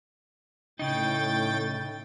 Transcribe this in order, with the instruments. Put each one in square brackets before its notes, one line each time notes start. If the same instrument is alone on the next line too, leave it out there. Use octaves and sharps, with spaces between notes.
[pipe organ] A2 G5 A6 [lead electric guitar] C#3 D#4